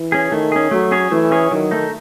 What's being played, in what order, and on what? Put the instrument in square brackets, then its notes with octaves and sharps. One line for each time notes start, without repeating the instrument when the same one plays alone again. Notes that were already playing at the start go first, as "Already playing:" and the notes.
Already playing: [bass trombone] E3
[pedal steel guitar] C#4 G#4
[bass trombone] D#3 [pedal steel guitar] A3
[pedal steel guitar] C#4 G#4
[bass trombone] F#3 [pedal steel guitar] A3
[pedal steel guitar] C#4 G#4 C#5
[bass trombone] E3 [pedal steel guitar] A3
[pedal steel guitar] C#4 G#4 C#5
[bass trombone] D#3 [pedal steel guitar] F#3
[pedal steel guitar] A3 D#4